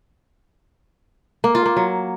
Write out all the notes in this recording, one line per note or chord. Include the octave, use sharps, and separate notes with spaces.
A#3
F4
A#3
F#3